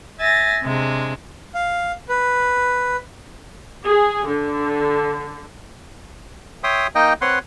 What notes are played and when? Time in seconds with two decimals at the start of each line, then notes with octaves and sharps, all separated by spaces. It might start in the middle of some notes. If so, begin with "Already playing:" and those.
0.18 E5 G#5 A6 A#6
0.63 C3 G#3 D4
1.54 F5
2.09 B4
3.85 G#4
4.27 D3
6.63 C#5 E5 G5 C6 D#6
6.95 A#3 D#4 D#5 G5
7.21 C4 B4 C#5 F#5 C6